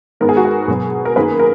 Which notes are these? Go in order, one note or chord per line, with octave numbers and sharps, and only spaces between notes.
G#2 D#3 G#3 B3 A#4
G#4
F#4
G#4
B2 F#3 B3
A#4
F#2 D#3 A#3 G#4 B4
A#4